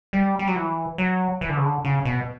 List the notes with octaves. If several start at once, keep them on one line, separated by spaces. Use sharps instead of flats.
G3
G3
F#3
E3
F#3
E3
D3
C#3
D3
C#3
B2